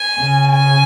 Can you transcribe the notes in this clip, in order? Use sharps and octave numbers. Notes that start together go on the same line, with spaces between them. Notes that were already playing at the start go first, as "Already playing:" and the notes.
Already playing: G#5
C#3
G#5